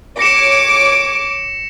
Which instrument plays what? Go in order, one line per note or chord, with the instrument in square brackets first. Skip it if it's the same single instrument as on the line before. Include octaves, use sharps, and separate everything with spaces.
[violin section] C#5 D6 [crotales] A#6 C#7 E7